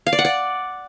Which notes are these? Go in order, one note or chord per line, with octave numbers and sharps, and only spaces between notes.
F5
D5
F#5
D5